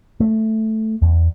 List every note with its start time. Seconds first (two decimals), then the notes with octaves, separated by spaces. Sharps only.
0.20 A3
1.02 E2